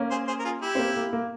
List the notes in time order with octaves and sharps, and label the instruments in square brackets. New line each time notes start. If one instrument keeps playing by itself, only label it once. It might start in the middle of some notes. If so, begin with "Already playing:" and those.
Already playing: [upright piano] A#3 C#4
[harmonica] G#4 C5
G#4 C5
A#4
F4 G#4
E4 G4
[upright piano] C4
A#3
A#3
A#3